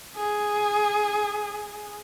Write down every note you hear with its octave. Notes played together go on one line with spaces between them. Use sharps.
G#4